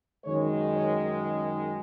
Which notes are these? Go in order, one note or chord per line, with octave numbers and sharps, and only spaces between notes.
F#2 D#3 G#3 C#5
C#5
D#5